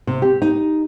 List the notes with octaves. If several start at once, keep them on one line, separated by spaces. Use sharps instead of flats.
C3
G4
D#4